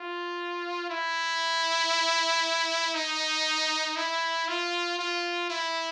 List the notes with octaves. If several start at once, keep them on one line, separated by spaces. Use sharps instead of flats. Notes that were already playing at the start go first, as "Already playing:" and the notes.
Already playing: F4
E4
D#4
E4
F4
F4
E4